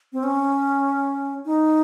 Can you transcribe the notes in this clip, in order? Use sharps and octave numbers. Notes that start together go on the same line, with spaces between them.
C4
C#4
D#4